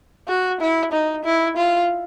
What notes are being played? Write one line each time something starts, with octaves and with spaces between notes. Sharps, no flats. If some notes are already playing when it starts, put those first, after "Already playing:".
F#4
E4
D#4
E4
F4